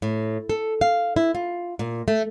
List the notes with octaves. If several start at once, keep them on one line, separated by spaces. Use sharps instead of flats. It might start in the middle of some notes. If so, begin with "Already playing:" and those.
A2
A4
F5
E4
F4
A#2
A3